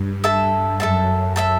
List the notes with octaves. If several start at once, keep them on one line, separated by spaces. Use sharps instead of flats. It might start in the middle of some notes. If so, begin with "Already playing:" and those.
Already playing: G2
A4 E5 A5
F#2 A4 E5 A5
A4 E5 A5